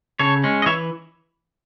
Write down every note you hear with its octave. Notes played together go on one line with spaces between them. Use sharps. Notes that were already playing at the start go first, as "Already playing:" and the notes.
C#3 A4 C#5
G#3 C#4
D#5
E3 C#5 E5